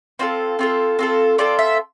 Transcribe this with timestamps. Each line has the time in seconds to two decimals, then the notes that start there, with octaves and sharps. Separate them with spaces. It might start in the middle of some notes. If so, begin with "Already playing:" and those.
0.19 C4 F4 A4 C5
0.59 C4 F4 A4
0.99 C4 F4 A4
1.38 C4 F4 A4 D5
1.59 E5